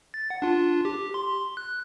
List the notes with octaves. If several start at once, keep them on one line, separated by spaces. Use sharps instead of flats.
A6
F#5
D4 F4
G4
C6
F#6